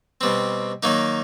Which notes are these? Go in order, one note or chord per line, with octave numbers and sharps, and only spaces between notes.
B2 G3 C4
D#3 F#3 A#3 D#4